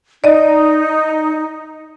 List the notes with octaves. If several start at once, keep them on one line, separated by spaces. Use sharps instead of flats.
D#4 D5 D#5